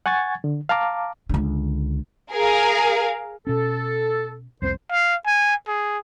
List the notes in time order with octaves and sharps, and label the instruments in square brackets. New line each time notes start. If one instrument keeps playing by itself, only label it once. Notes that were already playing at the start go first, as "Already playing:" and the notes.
[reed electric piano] F#5 G#5 C#6 G#6 A6
D3
F5 A5 A#5 D6
[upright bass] C#2 D3
[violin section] G#4 A#4 F5
[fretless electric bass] B2 C#4 [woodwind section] A4
[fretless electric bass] C2 F2 C4 [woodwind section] C5
[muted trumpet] F5
G#5
G#4